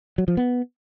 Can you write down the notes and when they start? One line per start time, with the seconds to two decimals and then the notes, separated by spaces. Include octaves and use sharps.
0.18 F#3
0.28 F3
0.37 B3